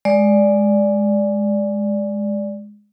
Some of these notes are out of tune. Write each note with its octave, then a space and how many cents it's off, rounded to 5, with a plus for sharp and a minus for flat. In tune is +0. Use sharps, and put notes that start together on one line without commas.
G#3 +0 D5 +0